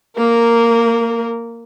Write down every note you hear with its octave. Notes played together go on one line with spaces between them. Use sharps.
A#3 A#4